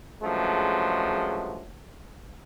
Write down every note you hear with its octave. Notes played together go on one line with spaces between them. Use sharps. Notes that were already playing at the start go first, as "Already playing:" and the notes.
G2 C#3 F3 F#3 G#3 A3